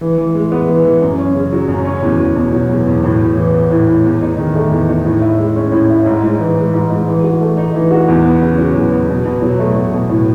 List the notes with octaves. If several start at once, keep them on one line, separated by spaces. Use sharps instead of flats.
E3
E3
G#3
B3
E3
E3
F#2
C#4
C#3
F#3
F#2
C#4
E2
E2
B2
F#3
E2
E2
A2
A2
E3
B3
A2
A2
E2
D#4
D#3
A3
E2
D#4
A2
E4
G#3
C#4
A2
E4
G#2
G#2
E3
G#3
G#2
G#2
E3
F#4
A3
D#4
E3
F#4
E2
B3
C#3
F#3
E2
B3
B2
B2
F#3
A3
B2
B2
A2